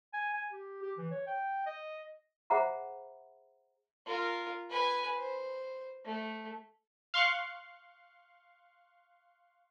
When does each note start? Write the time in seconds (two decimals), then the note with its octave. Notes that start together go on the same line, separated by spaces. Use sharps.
0.13 G#5
0.34 G#5
0.52 G4
0.82 G4
0.98 E3
1.11 C#5
1.27 G5
1.66 D#5
2.50 G#4 C5 E5 F#5 A#5 B5
4.06 F4 A#4
4.70 B4 G#5
5.18 C5
6.05 A3
7.14 F5 C6 C#6 F#6